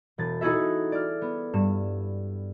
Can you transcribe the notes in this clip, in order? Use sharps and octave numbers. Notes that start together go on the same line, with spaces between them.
E1 A6
D#4 E4 F#4 G#4 A4 E5
D5 F6
B3
G2 E7